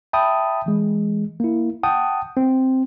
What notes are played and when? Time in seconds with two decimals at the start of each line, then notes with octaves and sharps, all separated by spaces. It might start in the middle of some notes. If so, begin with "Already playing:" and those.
0.13 E5 G5 A5 B5 D#6
0.66 E3 G#3
1.40 A#3 E4
1.83 F#5 G5 A5 D#6
2.37 C4